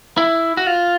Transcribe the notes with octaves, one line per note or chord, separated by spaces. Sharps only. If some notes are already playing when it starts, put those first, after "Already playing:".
E4
F#4
F4